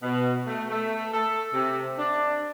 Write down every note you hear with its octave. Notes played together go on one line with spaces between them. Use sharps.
B2
A3
A3
A4
C3
D4